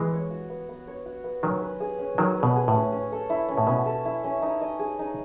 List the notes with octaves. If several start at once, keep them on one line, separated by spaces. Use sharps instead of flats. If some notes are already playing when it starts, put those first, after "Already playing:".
Already playing: E3 G#3 B3
C#5
F#4
B3
B3
C#5
F#4
B3
D#3 F#3 C#4
B4
G#4
C#4
D#3 F#3 C#4
B4
B2
G#4
A2
C#4
C#4
A4
E4
C#4
A2
B2 C#4
A4
E4
C#4
D#4
D#5
G#4
D#4